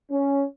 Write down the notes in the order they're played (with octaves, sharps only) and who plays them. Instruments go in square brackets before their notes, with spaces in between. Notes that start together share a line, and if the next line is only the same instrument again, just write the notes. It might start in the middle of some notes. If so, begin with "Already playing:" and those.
[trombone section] C#4